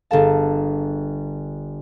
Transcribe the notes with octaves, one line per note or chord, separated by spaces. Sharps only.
G1 G#4 A4 F5 A5